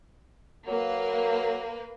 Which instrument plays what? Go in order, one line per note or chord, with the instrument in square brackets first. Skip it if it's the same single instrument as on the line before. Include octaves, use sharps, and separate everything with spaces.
[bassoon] F#3 [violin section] A#3 B4